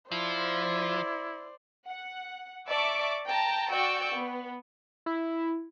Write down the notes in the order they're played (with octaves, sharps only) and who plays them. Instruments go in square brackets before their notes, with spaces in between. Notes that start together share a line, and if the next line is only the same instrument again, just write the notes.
[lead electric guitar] F3 [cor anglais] E4 [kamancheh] C5 D5
[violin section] F#5
D5 E5 A5 C#6 D6
G5 A5 A#5
F#4 D5 G5 C#6 E6
B3
[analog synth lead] E4